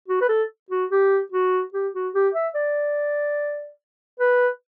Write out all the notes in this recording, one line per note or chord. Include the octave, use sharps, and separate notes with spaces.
F#4
B4
A4
F#4
G4
F#4
G4
F#4
G4
E5
D5
B4